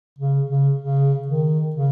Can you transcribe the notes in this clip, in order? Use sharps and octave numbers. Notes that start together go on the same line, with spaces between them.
C#3
C#3
C#3
D#3
C#3